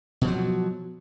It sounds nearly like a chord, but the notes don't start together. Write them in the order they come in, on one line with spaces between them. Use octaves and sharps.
B2 F3 F#3